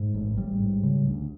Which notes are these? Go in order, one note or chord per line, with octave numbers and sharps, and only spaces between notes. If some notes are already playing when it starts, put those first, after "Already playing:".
Already playing: G#2
A1
A1 G3
G#2
C#3
D2